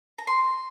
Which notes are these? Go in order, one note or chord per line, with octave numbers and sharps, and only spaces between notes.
A#5
C6